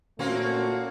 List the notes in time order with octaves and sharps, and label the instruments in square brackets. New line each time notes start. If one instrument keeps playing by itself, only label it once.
[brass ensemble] A#2 A3 F#4 [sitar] A#3 C4 C#4